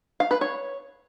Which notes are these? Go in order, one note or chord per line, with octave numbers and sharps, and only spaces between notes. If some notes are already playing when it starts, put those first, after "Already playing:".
F5
B4
C#5